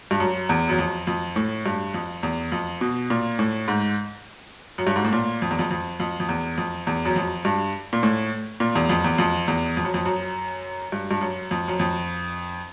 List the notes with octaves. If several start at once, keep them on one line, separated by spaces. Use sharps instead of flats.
G2
F#2
E2
F#2
F2
F2
A2
G2
F2
E2
F2
B2
A#2
A2
G#2
F#2
G2
G#2
A2
A#2
F2
E2
F2
F2
F2
F2
E2
F2
E2
F#2
F2
G2
A#2
A2
A#2
E2
F2
E2
F2
E2
F2
F#2
F2
F#2
G2
G2
F#2
F2
F#2
F2